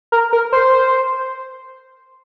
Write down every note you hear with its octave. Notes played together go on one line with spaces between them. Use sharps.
A#4
A#4
C5